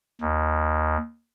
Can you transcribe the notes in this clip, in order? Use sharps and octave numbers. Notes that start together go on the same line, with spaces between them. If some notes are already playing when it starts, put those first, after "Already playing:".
D#2